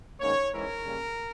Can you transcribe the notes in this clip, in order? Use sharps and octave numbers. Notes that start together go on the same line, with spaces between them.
G#2 D#3 A#3 C#4 C#5
G#2 E3 G#3 C#4 E4 A#4
C#3 G3 A#3 C#4